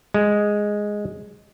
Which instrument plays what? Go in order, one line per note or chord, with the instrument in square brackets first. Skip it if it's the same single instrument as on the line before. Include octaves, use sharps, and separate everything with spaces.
[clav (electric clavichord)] G#3